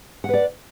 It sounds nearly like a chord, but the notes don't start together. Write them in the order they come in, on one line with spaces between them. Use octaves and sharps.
F#5 B4 D5